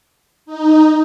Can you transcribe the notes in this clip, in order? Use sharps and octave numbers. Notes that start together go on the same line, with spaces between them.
D#4